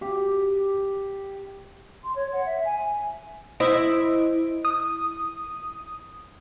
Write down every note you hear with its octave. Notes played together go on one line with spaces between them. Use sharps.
G4
C6
C#5
F#5
E5
G#5
E4 C5 D#5 D7
D#6